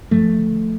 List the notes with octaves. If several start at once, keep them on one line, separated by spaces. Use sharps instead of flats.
G2 F3 A3
D3